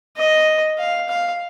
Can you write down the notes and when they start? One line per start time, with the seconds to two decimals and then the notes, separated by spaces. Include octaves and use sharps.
0.17 D#5
0.78 F5
1.09 F5